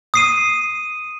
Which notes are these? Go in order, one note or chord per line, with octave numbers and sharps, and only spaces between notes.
D#6 C7 D#7